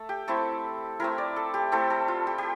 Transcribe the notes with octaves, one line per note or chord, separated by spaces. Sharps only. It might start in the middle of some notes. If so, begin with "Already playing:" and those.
Already playing: A3 A4
G4
A3 C4 E4 A4
A3 C4 E4 A#4
D5
A4
G4
A3 C4 E4 A4
A4
F4
G4
G4